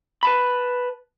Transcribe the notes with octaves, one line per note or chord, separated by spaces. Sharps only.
B4 A5 B5